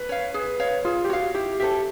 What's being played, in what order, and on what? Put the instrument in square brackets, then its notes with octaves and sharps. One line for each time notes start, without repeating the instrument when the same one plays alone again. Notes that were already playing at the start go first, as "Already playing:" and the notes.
Already playing: [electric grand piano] B4
[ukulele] C#5 F5
G#4
C#5 F5
[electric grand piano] F4 [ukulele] G#4
[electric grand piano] G4
[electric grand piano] F#4 [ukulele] C#5 F5
[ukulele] E4 [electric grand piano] G4
[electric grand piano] G4 [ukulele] A4 C5 E5